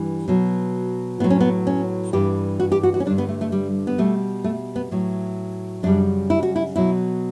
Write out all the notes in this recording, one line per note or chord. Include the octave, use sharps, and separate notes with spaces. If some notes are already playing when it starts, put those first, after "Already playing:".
Already playing: G2 E3 G3
B2 F#3
A2 F#3 B3
C#4
B3
C#4
G2 E3 G3 G4
F#4
G4
F#4
F#4
C#4
G2 D3 G3 D4
B3
A3
A3
G3
B3
B2 G3 A3
A3
B3
A2 F#3
F#2 C#3 G3 D4
E4
F#4
E4
B2 F#3 E4